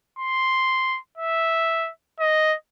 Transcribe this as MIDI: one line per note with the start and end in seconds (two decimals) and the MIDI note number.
0.19 0.99 84
1.18 1.90 76
2.20 2.55 75